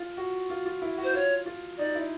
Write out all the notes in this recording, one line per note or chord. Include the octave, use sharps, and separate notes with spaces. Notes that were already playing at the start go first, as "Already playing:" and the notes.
Already playing: F4
F#4
F4
F4
E4
F#4
C5
F4 C#5
F4
D#4 D5
E4